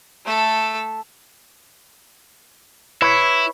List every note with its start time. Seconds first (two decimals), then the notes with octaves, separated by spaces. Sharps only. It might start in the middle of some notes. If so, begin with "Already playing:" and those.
0.25 A3 A4
3.02 E4 B4 C#5